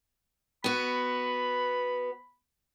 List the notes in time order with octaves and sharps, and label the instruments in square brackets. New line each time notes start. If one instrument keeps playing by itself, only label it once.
[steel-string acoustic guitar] B3 F#4 [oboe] B5